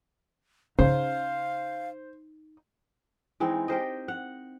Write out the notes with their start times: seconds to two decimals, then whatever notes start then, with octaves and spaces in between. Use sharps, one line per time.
0.79 C#3 D#4 C5 F5
3.40 E3 G#3 C4 D#4
3.68 G4 A#4 C5 D#5
4.08 F#5